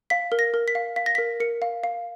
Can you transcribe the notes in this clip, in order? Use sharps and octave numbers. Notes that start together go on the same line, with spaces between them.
F5 B6
A#4
A#6
A#4
B6
F5
F5 B6
A#6
A#4 B6
A#4 C#7
F5
F5